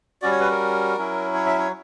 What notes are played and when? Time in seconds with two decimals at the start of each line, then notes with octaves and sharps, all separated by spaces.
0.22 G3 C#4 F#4 D5
0.31 C#5
0.40 B4
0.51 A#4
0.97 F#3 C#4 E4
1.34 C#5
1.46 E5
1.58 C#5